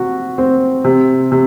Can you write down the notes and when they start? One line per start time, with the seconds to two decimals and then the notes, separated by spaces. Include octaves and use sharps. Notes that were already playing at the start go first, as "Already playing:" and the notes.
Already playing: C3 F#4
0.38 C4
0.84 C3
1.32 C3